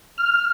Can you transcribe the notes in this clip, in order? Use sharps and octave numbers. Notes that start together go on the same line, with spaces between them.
F6